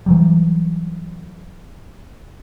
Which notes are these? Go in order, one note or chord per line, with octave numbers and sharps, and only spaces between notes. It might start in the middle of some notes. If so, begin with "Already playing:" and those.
E3 F#3 G3